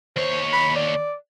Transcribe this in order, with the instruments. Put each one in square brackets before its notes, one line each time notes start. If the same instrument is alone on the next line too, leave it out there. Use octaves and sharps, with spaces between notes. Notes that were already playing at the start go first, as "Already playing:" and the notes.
[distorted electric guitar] D#2 C#5 [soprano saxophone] C5
[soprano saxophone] B5
D5